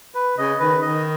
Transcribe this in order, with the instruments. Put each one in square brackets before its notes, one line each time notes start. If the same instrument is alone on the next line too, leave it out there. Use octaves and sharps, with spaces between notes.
[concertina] B4
[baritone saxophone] C#3 [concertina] D#5
[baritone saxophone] D#3 [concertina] B4
[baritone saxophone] D#3 [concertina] D#5